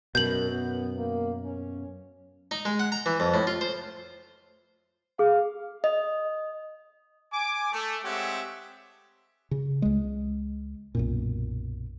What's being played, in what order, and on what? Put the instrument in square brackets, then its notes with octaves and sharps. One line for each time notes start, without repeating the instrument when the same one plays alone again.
[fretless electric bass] F#2 B2 [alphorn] A#4 [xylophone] G6 F#7
[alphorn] B3
A#3
C#4
[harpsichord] D#4
G#3
F#5
A#5
E3
F2
A2
F4
C5
[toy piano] G#4 [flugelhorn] F5
[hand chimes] D#5
[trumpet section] G#5 D6
A3
G#3 C4 G4 C#5 E5 F#5
[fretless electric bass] C#3
C#2 G#3
B1 F#2 A#2